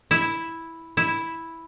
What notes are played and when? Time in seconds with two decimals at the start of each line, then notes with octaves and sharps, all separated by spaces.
0.11 E4
0.97 E4